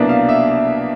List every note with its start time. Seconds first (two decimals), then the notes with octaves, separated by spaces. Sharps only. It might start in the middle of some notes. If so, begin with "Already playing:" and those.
Already playing: C2 B2 F#3 A#3 D4
0.09 F5
0.29 E5